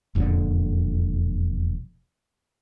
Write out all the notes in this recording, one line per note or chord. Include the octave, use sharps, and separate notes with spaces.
E1 F2 A#2 D3